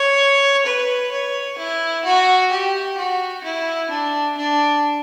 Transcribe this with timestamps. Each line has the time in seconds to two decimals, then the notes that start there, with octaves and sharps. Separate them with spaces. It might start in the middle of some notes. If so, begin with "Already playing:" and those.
Already playing: C#5
0.65 B4
1.11 C#5
1.57 E4
2.05 F#4
2.51 G4
2.97 F#4
3.43 E4
3.90 D4
4.37 D4